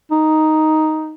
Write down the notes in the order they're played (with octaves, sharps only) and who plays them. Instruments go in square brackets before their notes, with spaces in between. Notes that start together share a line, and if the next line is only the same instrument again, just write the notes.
[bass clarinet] D#4